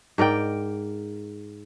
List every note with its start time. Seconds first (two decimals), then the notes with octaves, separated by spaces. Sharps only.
0.18 G#2 A#4 D5 G5